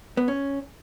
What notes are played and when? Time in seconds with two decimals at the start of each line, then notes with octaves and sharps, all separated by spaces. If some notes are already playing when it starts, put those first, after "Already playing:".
0.17 B3
0.28 C#4